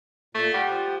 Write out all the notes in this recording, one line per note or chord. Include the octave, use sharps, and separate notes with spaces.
A#2 A3
G3 G4 F#5
F3